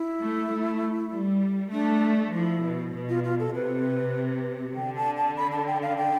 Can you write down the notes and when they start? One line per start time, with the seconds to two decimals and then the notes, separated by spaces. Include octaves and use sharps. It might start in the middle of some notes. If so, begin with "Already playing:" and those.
Already playing: E4
0.20 A3
0.51 A3
1.12 G3
1.72 A3 D4
2.34 F3 E4
2.63 B2
2.94 B2
3.09 F4
3.24 F4
3.40 A4
3.55 C3 B4
4.76 D3 G5
4.97 A5
5.17 A5
5.37 B5
5.52 A5
5.67 G5
5.83 F5
5.98 G5